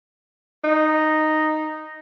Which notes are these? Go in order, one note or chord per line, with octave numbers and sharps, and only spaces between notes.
D#4